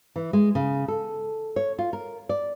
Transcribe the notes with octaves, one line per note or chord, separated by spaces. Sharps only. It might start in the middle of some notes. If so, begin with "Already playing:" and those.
E3
G#3
C#3
A4
C#5
F4
A#4
D5